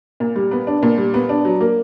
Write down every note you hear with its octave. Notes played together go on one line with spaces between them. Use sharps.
A#2
G3
B3
D4
A#2
G3
B3
D4
F#3
A#3